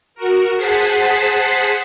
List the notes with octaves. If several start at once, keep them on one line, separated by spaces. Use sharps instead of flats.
F#4 A#4
G#4 C5 F#5 A5 B6 C7